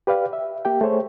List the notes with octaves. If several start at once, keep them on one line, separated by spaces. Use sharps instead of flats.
G4 B4 D5 F5
E5
A#3 G4 G5
A3 G#4 C5 C#5